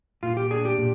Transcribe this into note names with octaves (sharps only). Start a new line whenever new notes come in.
A#2 F4
G4
D4 G#4
G4
A#2